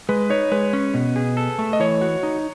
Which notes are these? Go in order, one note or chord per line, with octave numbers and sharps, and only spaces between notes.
G#3 B4
D#4 C#5
G#3 B4
C#4
B2
G#4
A4
A3
D#5
E3 C#5
F#4
D#4